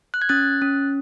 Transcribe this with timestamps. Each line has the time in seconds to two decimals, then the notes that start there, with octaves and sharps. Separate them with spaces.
0.14 F#6
0.22 G#6
0.29 C#4 F#6 A6
0.62 C#4